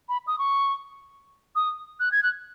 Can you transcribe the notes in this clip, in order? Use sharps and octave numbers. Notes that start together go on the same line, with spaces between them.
B5
D#6
C#6
D#6
F#6
G#6
F#6